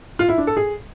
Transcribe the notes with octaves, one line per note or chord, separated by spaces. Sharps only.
F4
E4
D4
A4
G#4